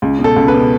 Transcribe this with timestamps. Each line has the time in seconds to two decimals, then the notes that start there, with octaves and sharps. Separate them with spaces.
0.02 C#2
0.19 B2
0.24 A4
0.36 C#2
0.48 B4
0.54 B2